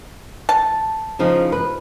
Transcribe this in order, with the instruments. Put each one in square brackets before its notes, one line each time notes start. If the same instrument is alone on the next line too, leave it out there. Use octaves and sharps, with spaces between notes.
[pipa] A5
[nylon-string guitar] C#3 F3 D#4
B4